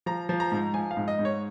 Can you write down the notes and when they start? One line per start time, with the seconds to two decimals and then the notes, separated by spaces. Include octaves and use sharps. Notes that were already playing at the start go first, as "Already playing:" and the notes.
0.06 F3 A#5
0.29 F3
0.40 A#5
0.52 G#2
0.74 F3 G#5
0.91 F5
0.97 G#2
1.08 D#5
1.19 G#2
1.25 C#5